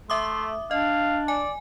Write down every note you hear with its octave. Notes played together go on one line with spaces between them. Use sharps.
A3 E5 C6 D6 D#6
D4 D#5 F5
D5 G#5